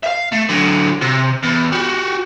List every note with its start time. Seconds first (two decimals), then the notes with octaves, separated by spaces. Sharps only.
0.03 E5 F5
0.32 A3
0.49 D3 F#3
1.01 C3
1.43 E2
1.72 F#4 G4